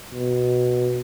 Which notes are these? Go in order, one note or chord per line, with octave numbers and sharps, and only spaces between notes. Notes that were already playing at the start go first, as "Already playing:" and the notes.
B2